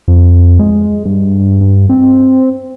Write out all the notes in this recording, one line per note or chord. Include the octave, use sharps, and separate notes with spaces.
F2
G#3
G2
G2
C4